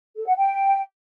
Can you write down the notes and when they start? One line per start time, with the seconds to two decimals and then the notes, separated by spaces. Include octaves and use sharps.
0.16 A4
0.26 F#5
0.36 G5